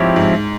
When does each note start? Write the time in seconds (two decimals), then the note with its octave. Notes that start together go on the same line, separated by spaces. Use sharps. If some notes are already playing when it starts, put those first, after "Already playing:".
Already playing: G#2 F3 C4 E4 G4 C#5
0.16 G#2